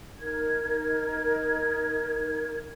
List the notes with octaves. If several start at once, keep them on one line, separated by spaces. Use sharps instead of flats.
D#4 A#4 G#6